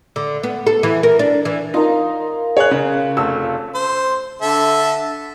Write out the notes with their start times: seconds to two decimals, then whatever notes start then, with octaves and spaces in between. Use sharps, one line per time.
0.16 D3
0.43 B3
0.67 A4
0.83 E3
1.03 A#4
1.19 D4
1.45 E3
1.74 D#4 F4 A#4
2.57 G#4 C#5 F#6
2.71 C#3 F5
3.17 F1 A4 E6
3.75 C5
4.42 D3 A4 E5